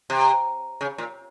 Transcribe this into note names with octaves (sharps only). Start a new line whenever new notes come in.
C3
C#3
A#2